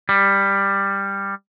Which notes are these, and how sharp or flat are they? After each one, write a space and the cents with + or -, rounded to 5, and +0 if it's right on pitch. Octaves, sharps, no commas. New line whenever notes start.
G3 +10